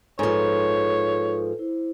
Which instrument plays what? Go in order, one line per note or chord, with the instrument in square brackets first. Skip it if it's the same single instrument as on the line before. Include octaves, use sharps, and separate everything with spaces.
[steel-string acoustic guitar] G#2 F3 [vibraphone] A4 B4 [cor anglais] C#5
[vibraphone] E4 C5